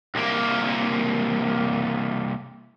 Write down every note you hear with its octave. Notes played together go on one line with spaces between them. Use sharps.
C2 A#3